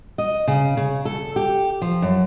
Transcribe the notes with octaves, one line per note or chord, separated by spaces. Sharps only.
D#5
C#3
C#3
A4
G4
F3
F#2